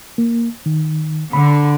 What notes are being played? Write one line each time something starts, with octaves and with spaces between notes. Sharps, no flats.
A#3
D#3
D3 B5